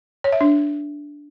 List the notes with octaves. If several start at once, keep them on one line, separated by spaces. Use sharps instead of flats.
C#5
E5
D4